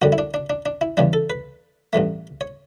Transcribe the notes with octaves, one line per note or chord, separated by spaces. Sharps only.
F#2 D3 G3 F#4
E4
D4
D4
D4
D4
E4
E2 C#3 E3 G3 D4
A4
B4
A1 G2 E3 A3
C#5